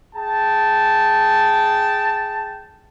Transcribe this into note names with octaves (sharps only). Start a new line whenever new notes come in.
G#4 G5 A5